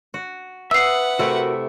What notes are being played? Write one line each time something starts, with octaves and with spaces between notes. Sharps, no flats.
F#4
B4 E5 F#5 D#6 E6 C7
C3 A3 E4 F#4 A#4